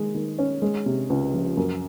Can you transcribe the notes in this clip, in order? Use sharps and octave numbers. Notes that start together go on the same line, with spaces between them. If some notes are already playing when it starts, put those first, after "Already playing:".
Already playing: D#3 G#3
D#3
C#4
G#3
C3
C#2
F3
F#2